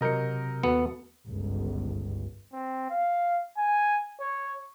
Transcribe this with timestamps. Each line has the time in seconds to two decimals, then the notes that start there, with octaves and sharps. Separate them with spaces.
0.01 C3 F#3 A#4 D#5 G6 C#7
0.63 D#2 B3 F#4 A4 C#7
1.26 G1 C#2
2.52 C4
2.90 F5
3.57 G#5
4.20 C#5